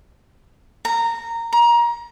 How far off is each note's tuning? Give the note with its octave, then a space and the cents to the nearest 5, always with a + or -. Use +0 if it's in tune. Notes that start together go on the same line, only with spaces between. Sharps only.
A#5 -15
A#5 +25